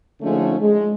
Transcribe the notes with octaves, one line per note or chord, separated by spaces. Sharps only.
D3 F3 G#3 A3 C#4 D#4
G#3